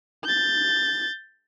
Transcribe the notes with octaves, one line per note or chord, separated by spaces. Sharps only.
G6 A6